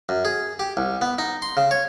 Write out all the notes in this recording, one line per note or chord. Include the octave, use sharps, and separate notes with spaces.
F#2
G#4
G4
C2
B3
D#4
C6
C#3
C#5